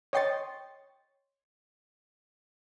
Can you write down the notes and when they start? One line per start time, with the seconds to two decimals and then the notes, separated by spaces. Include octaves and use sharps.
0.13 C#5 D#5 G5 C6 C#6 A6